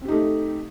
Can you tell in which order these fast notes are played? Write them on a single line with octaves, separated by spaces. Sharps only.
C4 G4 D#4 A3